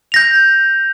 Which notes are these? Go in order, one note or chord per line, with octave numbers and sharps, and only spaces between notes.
G6 A#6 F7